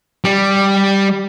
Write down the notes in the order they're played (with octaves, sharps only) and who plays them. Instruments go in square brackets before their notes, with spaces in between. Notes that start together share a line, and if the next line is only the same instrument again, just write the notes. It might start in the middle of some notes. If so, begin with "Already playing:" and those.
[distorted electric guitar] G3